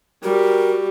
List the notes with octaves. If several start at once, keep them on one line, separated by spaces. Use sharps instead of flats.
G3 F#4 G4 A#4